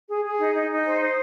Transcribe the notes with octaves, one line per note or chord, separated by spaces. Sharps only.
G#4
G#4
D#4
D#4
D#4
C5
C5